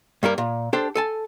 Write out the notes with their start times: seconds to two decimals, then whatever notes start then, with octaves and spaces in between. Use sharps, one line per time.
0.23 G2 G3 A#3 A#4
0.38 A#2
0.73 D4 G4 A4 C5
0.95 A4 G#5 A5